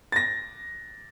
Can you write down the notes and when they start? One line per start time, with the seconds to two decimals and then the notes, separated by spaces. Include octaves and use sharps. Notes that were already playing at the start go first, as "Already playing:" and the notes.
0.12 A6 A#6